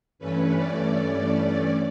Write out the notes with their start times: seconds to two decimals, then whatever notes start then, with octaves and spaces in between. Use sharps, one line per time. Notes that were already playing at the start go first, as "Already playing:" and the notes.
0.19 G2 E3 A3 C#4 B4
0.55 D5